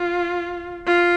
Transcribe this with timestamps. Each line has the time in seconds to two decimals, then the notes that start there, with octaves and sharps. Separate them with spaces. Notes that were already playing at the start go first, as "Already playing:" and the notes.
Already playing: F4
0.87 F4